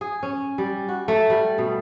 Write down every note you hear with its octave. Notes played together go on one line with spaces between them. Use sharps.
G#4
C#4
G3
F#4
A3
G3
B2